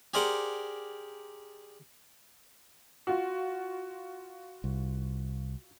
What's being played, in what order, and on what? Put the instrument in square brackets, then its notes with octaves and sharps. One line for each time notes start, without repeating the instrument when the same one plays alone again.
[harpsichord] G4 G#4 A#4 C5 D5 F#5
[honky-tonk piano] F4 F#4
[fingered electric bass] C2